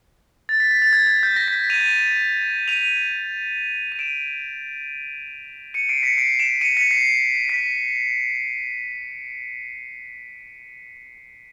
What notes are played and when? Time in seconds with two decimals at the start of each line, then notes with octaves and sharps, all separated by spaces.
0.49 A6
0.60 B6
0.71 B6
0.82 A6
0.93 G#6
1.07 G#6
1.23 G6
1.36 A#6
1.48 B6
1.60 B6
1.70 D#7 F7
2.68 D#7 F7
3.92 D#7
3.99 D7 E7
5.74 C#7 D#7
5.89 C7 D7
6.03 B6 C#7
6.18 C7 D7
6.40 D7 E7
6.61 C#7 D#7
6.77 B6 C#7
6.91 C7
7.49 B6